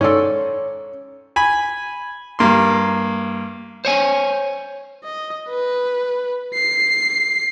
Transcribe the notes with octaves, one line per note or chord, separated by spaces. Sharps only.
G#2 C#4 A4 C#5 D5 C6
G#5 B5
G2 A#3 C6
C5 C#5 G#5
D#5
B4
C7